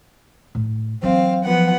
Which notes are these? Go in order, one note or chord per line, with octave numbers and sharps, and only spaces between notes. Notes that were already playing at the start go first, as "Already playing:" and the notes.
A2
E3 F#3 C4 F5
F3 B3 F#5